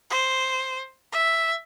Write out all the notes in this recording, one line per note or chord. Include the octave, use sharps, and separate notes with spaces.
C5
E5